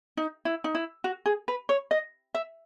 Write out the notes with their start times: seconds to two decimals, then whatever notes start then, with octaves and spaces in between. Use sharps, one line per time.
0.17 D#4
0.45 E4
0.64 D#4
0.75 E4
1.04 F#4
1.26 G#4
1.48 B4
1.69 C#5
1.91 D#5
2.35 E5